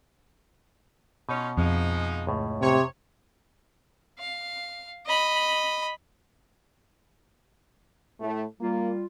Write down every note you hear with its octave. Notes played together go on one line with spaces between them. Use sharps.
B2 C#4 D#4 F4
F2 F3 G#3 D#4
C#2 A2
C3 C#5
F5
D#5 B5
A2 A3
G3 A#3 F4